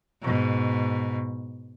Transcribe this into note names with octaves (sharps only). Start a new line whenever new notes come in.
G#2 B2